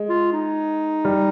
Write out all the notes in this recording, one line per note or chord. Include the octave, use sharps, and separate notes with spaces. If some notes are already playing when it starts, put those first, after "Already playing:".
Already playing: G#3
F4
D#4
G3